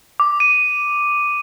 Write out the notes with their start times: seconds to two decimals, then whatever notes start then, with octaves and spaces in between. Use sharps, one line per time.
0.20 D6
0.40 D#7